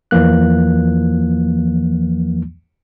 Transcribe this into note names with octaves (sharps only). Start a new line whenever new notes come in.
E2 E3 F3 A#3 F#6